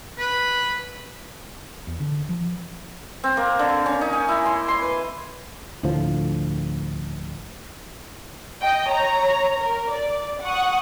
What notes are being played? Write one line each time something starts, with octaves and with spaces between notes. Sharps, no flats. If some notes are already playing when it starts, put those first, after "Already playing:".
B4
E2
D3
F3
C4
A#3
D3
C#4
D#4
G#5
E4
C6
C6
B4
D2 A2 D3 F3
D#5 G5
C#5 A#5
A#4
D5
F#5 C#6 D#6